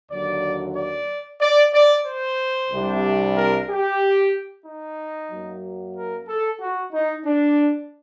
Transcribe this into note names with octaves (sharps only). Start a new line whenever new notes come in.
D#2 D3 F#3 D5
D5
D5
D5
C5
C2 C3 G3 D4
A#4
G4
D#4
F#2 F#3 A#3
A#4
A4
F#4
D#4
D4